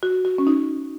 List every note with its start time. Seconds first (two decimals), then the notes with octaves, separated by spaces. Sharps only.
0.03 F#4
0.25 F#4
0.38 C#4
0.47 D#4